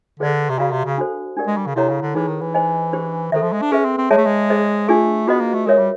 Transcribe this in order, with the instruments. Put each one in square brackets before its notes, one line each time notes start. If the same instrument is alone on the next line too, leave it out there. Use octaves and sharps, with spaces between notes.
[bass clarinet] D3 [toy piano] G#4 B4 D5
[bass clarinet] C3
[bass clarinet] C#3 [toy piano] F#4 B4 D5 F5 A#5
[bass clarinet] C3
C#3
[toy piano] D4 F#4 A4 C5
D4 G4 A#4 D5 F#5
[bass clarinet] G#3
G3
C#3
[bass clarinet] C3 [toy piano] E4 A4 C#5 F#5 A#5
[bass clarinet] C#3
D3
[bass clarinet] E3 [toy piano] D#4 G#4 B4
[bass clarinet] D#3
E3
[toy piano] C5 D#5 G#5
D4 G4 C5
[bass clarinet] D#3 [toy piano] A4 C5 E5
[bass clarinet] F3
G#3
D4
[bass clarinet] C#4 [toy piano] G#4 B4 E5
[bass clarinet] C4
C4
[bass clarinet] G#3 [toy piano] G#4 C#5 E5 A5
[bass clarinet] A3
G#3
[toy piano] G#4 C5 D#5
[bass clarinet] A3 [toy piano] D4 F4 G#4
[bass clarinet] B3 [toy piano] F#4 B4 D#5
[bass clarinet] A#3
A3
[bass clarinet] G#3 [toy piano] A#4 C#5 E5
[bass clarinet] G3